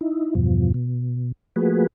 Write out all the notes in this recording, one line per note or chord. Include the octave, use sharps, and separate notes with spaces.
D#4 E4
E2 G2 B2 F3
B2
F3 A3 A#3 F#4 G#4 B4